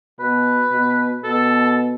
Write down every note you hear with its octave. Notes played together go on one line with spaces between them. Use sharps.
B2 B4
B2
B2 A4